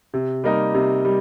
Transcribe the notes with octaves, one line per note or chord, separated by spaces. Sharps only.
C3
G3 A#3 D#4 A#4
C3
G3